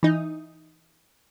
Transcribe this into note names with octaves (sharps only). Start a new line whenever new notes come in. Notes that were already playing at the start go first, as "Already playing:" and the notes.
E3 D#4